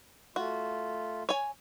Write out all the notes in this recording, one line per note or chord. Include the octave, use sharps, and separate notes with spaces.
A3 F4 F#4
C#5 G#5